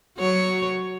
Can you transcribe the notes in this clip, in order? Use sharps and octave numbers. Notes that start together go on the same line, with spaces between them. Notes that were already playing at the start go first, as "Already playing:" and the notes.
F#3 C#5